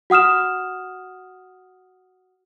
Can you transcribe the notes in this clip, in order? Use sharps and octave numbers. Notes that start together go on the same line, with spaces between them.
F#4 F#5 D#6 F6 E7